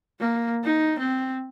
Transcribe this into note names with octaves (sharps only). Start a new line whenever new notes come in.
A#3
D#4
C4